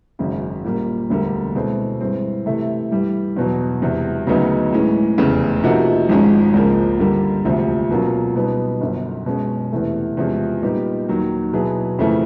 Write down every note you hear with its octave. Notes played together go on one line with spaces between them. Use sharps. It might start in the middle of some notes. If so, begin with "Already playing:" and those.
G#1 F#2 C#3
A#2 G3 A#3
E1 D2 D3 G3 A#3
B2 G#3 C4 E4 A4
G2 E3 G#3 C4
C3 E3 A3
G2 E3 G3
E2 B2 F#3
E1 E2 C3
D2 C#3 F#3 B3 D#4
A2 E3 G#3 C#4
F1 E2 C#3
C3 F3 A#3 D#4 F#4
G#1 G#2 F3 G#3 C#4
C#2 C#3 F3 A#3
G2 D3 G3 A#3
E1 D2 C3 F3
B2 F#3 A#3 C#4 F4
B2 G3 B3 D#4
G1 F#2 D3
B2 G#3 C#4
E2 C3 E3 A3
E2 C3 F3 G#3 C#4
A#2 G3 B3 D#4 G4
D#2 D#3 F#3
B2 F#3 B3 E4 G#4
F2 C#3 E3 A3